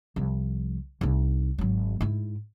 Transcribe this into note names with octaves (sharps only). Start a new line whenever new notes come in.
C2 F3
C2 D#4
G#1 F#3
G#2 E4